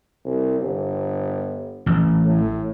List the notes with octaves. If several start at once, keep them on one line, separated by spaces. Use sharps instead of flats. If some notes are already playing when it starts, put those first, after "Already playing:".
C2
G1
A1
A2